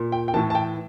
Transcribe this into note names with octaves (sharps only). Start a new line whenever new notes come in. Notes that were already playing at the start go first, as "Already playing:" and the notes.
Already playing: A#2
G5
G5
A2 E3 A5
A5
G5